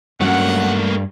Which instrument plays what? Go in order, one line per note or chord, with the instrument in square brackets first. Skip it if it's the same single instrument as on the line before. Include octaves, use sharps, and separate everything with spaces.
[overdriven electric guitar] G2 [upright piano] F#3 C#4 [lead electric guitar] A3 A#3 [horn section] F#5